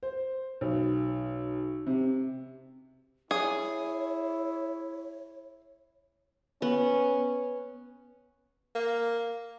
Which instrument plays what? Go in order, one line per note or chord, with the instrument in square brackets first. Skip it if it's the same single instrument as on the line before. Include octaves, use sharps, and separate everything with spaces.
[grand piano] C5
B1
C3
[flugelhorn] E4 [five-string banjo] G#4 [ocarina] C#5
[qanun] B3 [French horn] C#4
[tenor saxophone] A#3